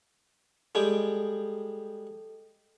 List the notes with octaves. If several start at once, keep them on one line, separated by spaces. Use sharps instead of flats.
G3 G#3 A4 G5